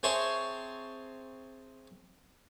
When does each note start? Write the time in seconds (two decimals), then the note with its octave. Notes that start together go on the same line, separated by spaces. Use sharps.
0.03 C4 G#4 C#5 E5 A5 C6